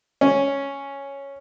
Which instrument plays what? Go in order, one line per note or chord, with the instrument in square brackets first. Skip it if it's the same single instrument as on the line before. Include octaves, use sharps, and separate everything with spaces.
[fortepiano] C#4